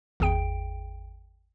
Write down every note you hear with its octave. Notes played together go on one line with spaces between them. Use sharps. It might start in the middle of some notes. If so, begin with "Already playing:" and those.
G#1 E2 G#4 G5 D7